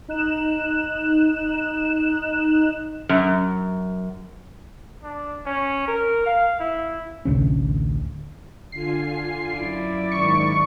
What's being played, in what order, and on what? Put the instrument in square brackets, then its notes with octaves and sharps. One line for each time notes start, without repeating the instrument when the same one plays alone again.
[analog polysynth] D#4 F#6 E7
[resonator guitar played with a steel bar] F#2
[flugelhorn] D4
C#4
A#4
F5
E4
[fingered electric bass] A1 D2 C3 C#4
[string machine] D3 F4 G#5 [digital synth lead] C7
[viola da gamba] F#2 E4 D5
[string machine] G#2 D#3 [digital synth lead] C#6